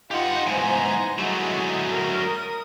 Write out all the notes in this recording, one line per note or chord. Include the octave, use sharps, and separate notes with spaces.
D#4 F4 G4 B4 F#5 G5
G#2 E3 B3 C5 G#5 A#5
F#3 G#3 A3 E4 F#4 G#4
A#4
D#6